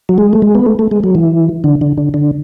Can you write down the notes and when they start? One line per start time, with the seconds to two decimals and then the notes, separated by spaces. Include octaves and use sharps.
0.09 F#3
0.18 G#3
0.33 A3
0.42 G#3
0.55 B3
0.66 A3
0.79 A3
0.91 G#3
1.04 F#3
1.15 E3
1.64 D3
1.81 D3
1.98 D3
2.14 D3